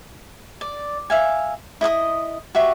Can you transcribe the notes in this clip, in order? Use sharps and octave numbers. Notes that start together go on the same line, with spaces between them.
D5
E5 F5 G#5
E4 D#5 E5 D#6
F#4 G4 E5 C#6